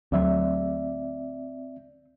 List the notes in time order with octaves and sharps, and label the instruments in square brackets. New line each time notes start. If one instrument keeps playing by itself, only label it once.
[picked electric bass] D2 F#3 [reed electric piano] C4 D5 E5